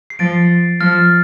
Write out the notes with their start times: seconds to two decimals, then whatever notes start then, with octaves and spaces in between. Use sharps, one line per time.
0.10 C7
0.19 F3 A6 D7
0.81 F3 F6 A6